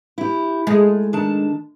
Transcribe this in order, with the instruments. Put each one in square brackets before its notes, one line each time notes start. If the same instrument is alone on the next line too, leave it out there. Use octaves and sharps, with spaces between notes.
[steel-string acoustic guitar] E4 G4
[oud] G#3 [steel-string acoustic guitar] A3
[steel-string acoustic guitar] D#3 D4 A5